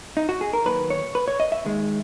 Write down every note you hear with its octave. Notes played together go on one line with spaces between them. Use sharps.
D#4
F#4
G#4
A#4
D#2 D#3 F#3 A#3 B4
C#5
B4
C#5
D#5
E5
D#2 D#3 G#3